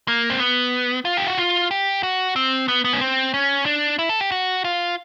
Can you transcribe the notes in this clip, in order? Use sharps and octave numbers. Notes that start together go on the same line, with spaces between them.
A#3
C4
B3
F4
G4
F#4
F4
G4
F#4
C4
B3
B3
C#4
C4
C#4
D4
E4
A4
G4
F#4
F4